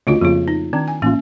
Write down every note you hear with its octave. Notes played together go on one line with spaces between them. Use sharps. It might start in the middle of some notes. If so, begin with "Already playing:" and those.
D2 C#3 A3 F4 F#4
F2 C#3 A#3 F4
D#4
D#3 C4 D4
G#5
A1 A#3 C#4 F4